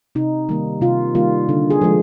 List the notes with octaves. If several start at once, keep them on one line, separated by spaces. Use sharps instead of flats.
C3 D#4
D#3 G3 A#3
C3 F4
D#3 G3 A#3 F4
D3
G#4
F3 G#3